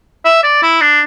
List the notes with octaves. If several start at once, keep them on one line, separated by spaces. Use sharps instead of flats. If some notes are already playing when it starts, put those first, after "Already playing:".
E5
D5
E4
D4